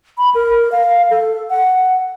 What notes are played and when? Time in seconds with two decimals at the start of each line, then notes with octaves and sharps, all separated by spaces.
0.18 B5
0.35 A#4
0.72 F5
1.11 A4
1.50 F#5